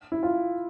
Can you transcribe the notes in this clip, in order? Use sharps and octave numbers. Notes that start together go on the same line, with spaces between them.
E4
F4